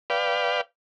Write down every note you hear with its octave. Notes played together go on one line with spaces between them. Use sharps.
B4 D5 F5 G5